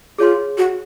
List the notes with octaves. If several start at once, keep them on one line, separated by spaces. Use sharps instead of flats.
F4 G#4 C#5 F5 G#5 C6
F#4